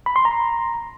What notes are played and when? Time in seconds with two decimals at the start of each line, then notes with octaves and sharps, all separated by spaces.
0.06 B5
0.16 C6
0.25 A#5